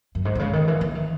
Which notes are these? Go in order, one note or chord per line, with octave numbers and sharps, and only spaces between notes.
F#2
G#2
B2
C#3
D#3
E3
E3
D#3